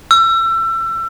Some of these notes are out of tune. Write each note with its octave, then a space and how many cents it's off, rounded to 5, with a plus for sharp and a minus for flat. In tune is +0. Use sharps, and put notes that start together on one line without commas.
E6 +30